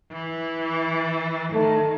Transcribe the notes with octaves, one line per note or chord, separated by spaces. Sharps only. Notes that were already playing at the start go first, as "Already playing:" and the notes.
E3
D#3 A3